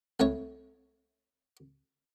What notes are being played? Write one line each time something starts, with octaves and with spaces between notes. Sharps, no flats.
C2 A3 C#5